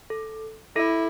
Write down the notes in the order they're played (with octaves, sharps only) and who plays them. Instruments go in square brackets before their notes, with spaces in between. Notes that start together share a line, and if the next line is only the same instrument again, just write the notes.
[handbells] A4
[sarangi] E4 [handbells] A4